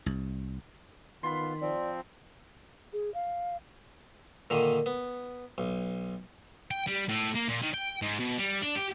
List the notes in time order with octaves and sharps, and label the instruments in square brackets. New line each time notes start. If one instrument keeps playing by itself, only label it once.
[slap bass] C2
[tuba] D#3 [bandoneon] B3 F4 [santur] B5 C6
[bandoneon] F3 C4 [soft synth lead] D5
[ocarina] G#4
F5
[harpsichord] A#2 D3 D#3
B3
B1
[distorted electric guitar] G5
G3
A2
A#3
A#2
D#3
G5
G#2
B2
G3
D4
G4